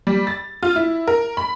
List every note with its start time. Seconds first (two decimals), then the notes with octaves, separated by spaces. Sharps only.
0.07 G3
0.27 A6
0.63 F4
0.76 E4
1.07 A#4
1.37 B5